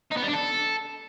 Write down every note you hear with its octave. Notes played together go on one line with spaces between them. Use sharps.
D#4
B3
G3
D4
A4